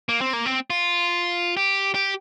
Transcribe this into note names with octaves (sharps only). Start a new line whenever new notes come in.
A#3
C4
A#3
C4
F4
G4
G4